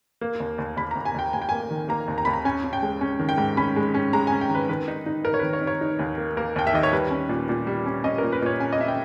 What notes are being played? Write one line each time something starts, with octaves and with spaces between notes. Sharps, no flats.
A#3
D#2
D#2
D#2 B5
A#5
D#2
G#5
D#2 G5
D#2 G#5
G5
A#3 G#5
D#3
A#3 A#5
D#2
A#5
D#2 B5
A#5
C#4 G#5
C#4
G5
G#3
C#4
D#3
G5
G#2
C#4 B5
G#3
C#4
G#3 A#5
G#5
C#4
G5
D#3
B4
D#3 B4
D#4
D#4
D#4 A#4
C#5
B4
D#3
C#5
D#4
C#5
D#4
D#2
A#3
A#3 A#4
D#2 G5
E5
D#3 D#5
C#5
G3 B4
C#4
A#2
A#2
G3
C#4
C#4 D#5
A#4
A#2
B4
A#2 C#5
C#4 G#5
D#5
C#4 E5
G5